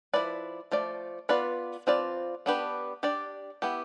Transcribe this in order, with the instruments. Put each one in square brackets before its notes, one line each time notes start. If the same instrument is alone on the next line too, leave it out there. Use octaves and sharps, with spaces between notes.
[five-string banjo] F3 A3 E4 B4 D5
F3 A3 D5
B3 F4 B4 D5
F3 C4 F4 B4 D5
B3 D4 G4 B4
D4 G4 D5
B3 E4 G4